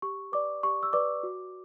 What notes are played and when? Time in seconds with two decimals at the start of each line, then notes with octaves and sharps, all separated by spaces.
0.02 G4 C#6
0.32 B4 D5 D6
0.63 G4 C#6
0.83 E6
0.93 B4 D5 D6
1.23 F#4